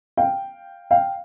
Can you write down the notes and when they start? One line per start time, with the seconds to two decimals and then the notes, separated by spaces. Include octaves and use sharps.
0.17 F5 G5
0.91 F5 G5